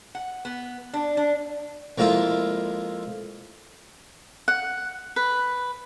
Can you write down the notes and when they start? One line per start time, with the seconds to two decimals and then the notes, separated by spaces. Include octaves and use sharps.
0.15 F#5
0.45 B3
0.93 D4
1.17 D4
1.98 F2 G#3 A#3 E4 F4
4.48 F#5
5.16 B4